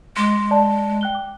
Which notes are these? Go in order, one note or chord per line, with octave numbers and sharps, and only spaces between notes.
G#3 C6 D6
D5 A5
G5 F#6 G7
D6